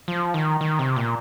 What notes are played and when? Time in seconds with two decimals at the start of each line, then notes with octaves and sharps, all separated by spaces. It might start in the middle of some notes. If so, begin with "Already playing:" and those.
0.08 F3
0.34 D#3
0.61 D#3
0.79 C3
0.96 A#2